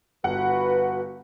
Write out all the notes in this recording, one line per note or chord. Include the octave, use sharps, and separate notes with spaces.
G1 F#4 B4 F#5